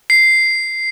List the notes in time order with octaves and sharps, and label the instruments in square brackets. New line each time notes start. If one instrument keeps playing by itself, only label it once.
[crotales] C7